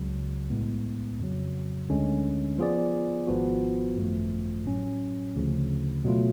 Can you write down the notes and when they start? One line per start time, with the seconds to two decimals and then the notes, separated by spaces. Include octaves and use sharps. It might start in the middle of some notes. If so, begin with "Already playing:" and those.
Already playing: C#2 C#3 F#3
0.50 B1 A2 G#3 B3
1.20 F2 C#3 F#3
1.89 D2 D3 G#3 C#4
2.58 F3 B3 F4 G#4 D5
3.27 G#1 G#2 F3 B3 F#4
3.96 G#1 F#2 F3 A3
4.66 A2 F#3 C#4
5.36 D2 C#3 F3
6.05 B2 F#3 A3 F4